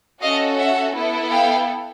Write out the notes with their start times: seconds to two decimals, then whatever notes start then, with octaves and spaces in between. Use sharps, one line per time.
0.22 C#4 F#4 A4 D#5 F5
0.58 E5 F#5
0.95 B3 E4 A4
1.31 F5 G5